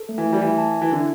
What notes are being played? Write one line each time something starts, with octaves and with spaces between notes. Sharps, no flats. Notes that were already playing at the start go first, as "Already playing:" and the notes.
Already playing: A4
A3
E3
A3
G3
E3 E5
A5
E5
E3
D3 E4